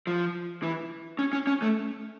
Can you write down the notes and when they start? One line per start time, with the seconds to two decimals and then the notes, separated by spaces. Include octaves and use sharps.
0.07 F3
0.63 E3
1.19 C#4
1.33 C#4
1.47 C#4
1.62 A3